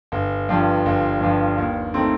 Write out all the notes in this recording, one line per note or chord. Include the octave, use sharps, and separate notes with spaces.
G1
G2 F3
G1
G2 F3
D#2
D#3 A3 C4